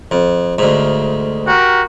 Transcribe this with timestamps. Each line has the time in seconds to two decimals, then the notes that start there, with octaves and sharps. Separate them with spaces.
0.11 F2
0.58 D2 G#2
1.47 F#4 G4 A#4